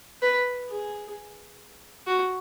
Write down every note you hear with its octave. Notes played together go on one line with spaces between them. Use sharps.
B4
G#4
F#4